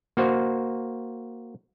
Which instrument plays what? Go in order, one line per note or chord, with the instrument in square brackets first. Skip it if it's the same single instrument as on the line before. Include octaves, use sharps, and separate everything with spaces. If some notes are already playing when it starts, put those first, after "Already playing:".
[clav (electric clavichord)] A#3 F#4 C5